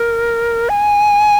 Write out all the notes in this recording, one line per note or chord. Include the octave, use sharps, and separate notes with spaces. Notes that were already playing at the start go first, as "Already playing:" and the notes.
Already playing: A#4
G#5